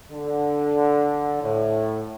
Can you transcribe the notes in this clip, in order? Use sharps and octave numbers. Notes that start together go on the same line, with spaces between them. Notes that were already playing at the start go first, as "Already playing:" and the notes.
D3
A2